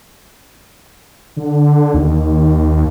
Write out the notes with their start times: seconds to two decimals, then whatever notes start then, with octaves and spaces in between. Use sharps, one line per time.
1.37 D3
1.94 D#2